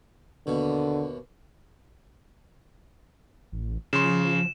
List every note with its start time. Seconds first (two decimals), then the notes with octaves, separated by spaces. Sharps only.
0.47 D#2 B2 D3
3.52 A1
3.93 C#3 F3 C6 E7